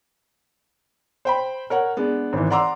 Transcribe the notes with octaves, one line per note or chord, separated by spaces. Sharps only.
C5 G5 B5
A#4 C#5 F#5
G#3 B3 D4
G#1 E3
D5 F#5 A#5 C6 D6 E6